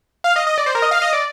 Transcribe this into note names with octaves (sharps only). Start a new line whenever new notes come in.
F5
D#5
D#5
D5
C5
A#4
D#5
F5
D#5
D5